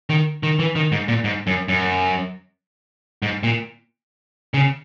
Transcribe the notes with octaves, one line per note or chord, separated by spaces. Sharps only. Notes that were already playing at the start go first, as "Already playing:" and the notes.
D#3
D#3
E3
D#3
G#2
A#2
G#2
F#2
F#2
G#2
A#2
C#3